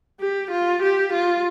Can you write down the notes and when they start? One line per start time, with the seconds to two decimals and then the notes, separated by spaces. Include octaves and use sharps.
0.20 G4
0.51 F4
0.83 G4
1.13 F4